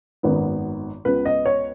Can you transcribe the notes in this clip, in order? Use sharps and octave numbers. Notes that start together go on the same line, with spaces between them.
G#1 F#2 D#3 B3
C#2 C#3 B3 B4
D#5
C#5